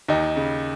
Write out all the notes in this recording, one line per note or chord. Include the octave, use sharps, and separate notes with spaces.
D#2 D#4
C#3